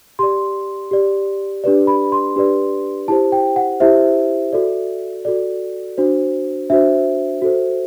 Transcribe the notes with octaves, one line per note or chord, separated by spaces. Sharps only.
G4 D5 C6
G4 D5
D4 G4 B4 D5
B5
C6
D4 G4 B4 D5
E4 G4 C5 A5
G5
F#5
E4 G4 C5 E5
F#4 A4 D5
F#4 A4 D5
D4 F#4 C5
D4 F#4 C5 E5
F#4 A4 C5